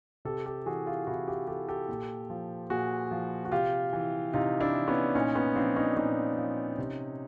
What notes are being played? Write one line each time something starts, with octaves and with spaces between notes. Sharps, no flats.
C3 G4 A4
G4 A4
E3 F#4 G#4
F4 G4
C3 E4 F#4
F4 G4
E3 G4 A4
G4 A4
A#2
F3
A#2 F#4 G#4
F3
F#4
C3 F4 G4
E3
C3 D#4 F4
D4 E4
E3
B3 C#4
A#2 C#4 D#4
B3 C#4
F3 C4 D4
C#4 D#4
A#2 C#4 D#4
F3
C3